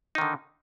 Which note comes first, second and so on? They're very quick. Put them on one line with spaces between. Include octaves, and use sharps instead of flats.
D#4 D#3 D3